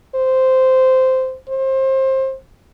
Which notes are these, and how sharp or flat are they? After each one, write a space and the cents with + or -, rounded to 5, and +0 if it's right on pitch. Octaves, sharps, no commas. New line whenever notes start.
C5 -10
C5 +25